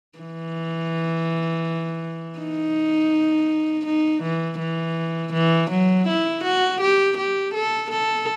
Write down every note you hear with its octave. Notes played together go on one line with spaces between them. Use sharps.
E3
D#4
D#4
E3
E3
E3
F#3
E4
F#4
G4
G4
A4
A4